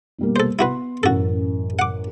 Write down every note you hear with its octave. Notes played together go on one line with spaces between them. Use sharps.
B2 G3 A#3
A4 C5
B3 E4 F#4 B4 C6
A1 F#2 F#4 A4
F#5 D6